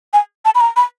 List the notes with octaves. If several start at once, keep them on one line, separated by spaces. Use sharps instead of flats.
G#5
A5
B5
A#5
B5